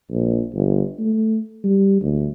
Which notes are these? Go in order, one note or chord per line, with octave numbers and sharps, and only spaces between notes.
A#1
G1
A3
G3
D2